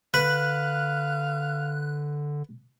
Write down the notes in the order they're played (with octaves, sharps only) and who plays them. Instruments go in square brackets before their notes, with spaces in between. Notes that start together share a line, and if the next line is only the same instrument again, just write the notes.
[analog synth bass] D3 [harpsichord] B4 [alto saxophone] F5 [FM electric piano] F#6